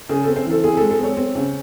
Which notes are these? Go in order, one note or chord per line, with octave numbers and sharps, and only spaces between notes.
C#3 G#4
C4 A4
C5
E3 A4
C4 G#4
A4
G#3
A4
C4 C#5
C4
C#3